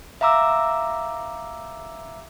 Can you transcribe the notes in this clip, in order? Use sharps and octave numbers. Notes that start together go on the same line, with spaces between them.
E5 F5 A#5 D6 E6